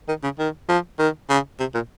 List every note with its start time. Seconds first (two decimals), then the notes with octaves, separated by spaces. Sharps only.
0.08 D#3
0.24 C#3
0.39 D#3
0.69 F3
0.99 D#3
1.30 C#3
1.60 C3
1.75 A#2